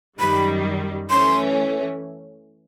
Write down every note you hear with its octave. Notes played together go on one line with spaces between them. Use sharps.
F#2 D#3 G3 B5
E3 A3 C#4 C6